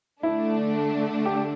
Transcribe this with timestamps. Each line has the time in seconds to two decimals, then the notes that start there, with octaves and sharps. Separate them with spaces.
0.22 D3 A3 D4 E4
1.26 G4